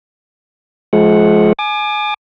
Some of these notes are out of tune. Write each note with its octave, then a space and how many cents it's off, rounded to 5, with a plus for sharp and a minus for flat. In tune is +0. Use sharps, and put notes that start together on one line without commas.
F3 +0 G#3 +35 F#5 +0
G#5 +20 D6 +35